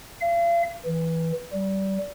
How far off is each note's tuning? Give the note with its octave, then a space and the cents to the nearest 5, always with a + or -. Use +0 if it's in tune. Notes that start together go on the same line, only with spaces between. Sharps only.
F5 -40
E3 -10
G3 -25